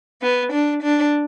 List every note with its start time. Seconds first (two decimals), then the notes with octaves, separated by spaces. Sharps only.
0.22 B3
0.52 D4
0.82 D4